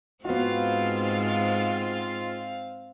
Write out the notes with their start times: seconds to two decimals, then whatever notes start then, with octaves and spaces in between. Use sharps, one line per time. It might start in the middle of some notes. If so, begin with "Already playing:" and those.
0.25 G#2 B3 C4 F4 F#4 F5